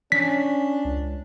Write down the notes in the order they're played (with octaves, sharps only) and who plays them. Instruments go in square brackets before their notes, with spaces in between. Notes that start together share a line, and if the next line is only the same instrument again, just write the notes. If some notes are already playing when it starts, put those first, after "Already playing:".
[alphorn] C#4 [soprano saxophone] D4 [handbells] B6
[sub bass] C#2